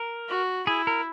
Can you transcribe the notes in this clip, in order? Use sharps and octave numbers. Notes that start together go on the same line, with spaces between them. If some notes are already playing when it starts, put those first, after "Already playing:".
Already playing: A#4
F#4
E4 G#4
A#4